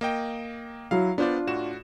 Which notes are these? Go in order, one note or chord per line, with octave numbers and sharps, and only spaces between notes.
A#3 D#5 G5
F#3 E4 F5
B3 D4 F4 C5 D5
A2 F#4 E7